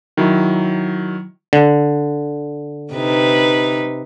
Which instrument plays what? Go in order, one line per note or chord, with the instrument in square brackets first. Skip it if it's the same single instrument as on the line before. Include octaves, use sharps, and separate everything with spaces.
[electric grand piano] D#3 F#3 E4
[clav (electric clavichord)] D3
[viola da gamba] C3 D#4 B4